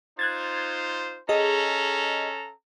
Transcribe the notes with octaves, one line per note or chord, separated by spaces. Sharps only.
D#4 F4 C5 F#6 G#6 A6
C#4 G#4 A4 D#5 A#5